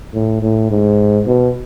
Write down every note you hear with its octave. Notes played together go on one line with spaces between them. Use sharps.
A2
A2
G#2
B2